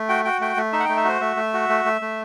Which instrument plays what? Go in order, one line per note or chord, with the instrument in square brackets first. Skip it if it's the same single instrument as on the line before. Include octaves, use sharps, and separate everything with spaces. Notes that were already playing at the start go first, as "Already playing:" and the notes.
Already playing: [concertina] A3
F#4 G5
F#4 G5
A3 G5
A3
D#4 E5
F#5
A3 G5
E5
F#4 C5
A3 E5
A3
F#4
A3
A3
A3